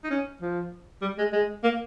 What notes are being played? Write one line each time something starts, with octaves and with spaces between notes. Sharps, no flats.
D#4
C#4
F3
G3
G#3
G#3
A#3